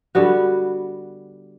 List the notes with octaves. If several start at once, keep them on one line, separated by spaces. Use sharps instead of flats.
D3 G3 B3 F#4